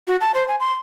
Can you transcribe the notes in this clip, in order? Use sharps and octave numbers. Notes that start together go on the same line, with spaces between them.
F#4
A5
C5
G#5
C6